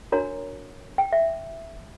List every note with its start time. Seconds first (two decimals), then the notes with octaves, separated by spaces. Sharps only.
0.12 D4 F#4 A#4 C#5 A#5
0.98 G5
1.13 E5